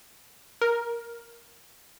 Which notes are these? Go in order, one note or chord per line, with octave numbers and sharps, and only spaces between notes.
A#4